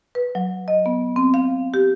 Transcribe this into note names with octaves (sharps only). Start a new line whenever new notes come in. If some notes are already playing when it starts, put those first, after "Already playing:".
B4
F#3
D#5
B3
C4
F5
G4